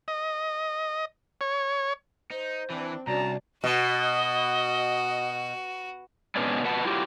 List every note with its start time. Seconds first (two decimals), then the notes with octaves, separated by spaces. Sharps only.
0.08 D#5
1.41 C#5
2.31 D#4 C5
2.70 E3 C4 D4
3.07 C2 C#4 D4 F#4 A5 A#5
3.64 B2 F#4 D#5
6.36 G#2 B2 B3 C#4 D4
6.64 F2 B2 B4 F#5 A5
6.84 F#3 E4 F4 G4